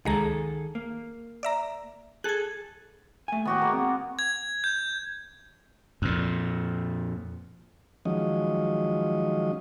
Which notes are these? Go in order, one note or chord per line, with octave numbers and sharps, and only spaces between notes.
C#2 D#3 G#3 G#4 A4 A#5
A#3
D5 E5 A#5
G#4 A4 F#6 G#6
A3 G#5
D#2 A2 B3 F#4 G4
G#3 A#3 B3
C4
G#6
G6
F2 A#2
D#3 F3 F#3 G#3 C#4 D#5